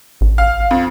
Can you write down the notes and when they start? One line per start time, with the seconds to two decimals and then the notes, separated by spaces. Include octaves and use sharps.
0.21 A1
0.38 F5
0.71 F2